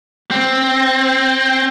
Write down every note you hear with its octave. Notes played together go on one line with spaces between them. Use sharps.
C4